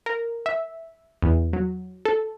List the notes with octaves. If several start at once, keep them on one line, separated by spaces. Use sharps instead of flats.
A#4
E5
E2
F#3
A4